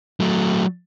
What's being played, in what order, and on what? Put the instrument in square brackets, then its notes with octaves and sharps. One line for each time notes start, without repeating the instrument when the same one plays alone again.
[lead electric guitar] F#3 A3